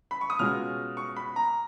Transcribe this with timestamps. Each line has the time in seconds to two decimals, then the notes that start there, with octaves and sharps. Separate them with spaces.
0.11 B5
0.21 C#6
0.30 D#6
0.39 B2 G#3 C#4 F4 F6
0.97 C#6
1.16 B5
1.36 A#5